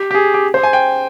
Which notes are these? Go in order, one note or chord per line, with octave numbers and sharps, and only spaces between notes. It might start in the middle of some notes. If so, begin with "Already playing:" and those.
Already playing: G4
G4
G#4
G4
C5
G#5
G5